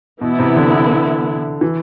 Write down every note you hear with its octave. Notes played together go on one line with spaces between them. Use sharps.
B2 E3 B3 E4
C3
D3
E3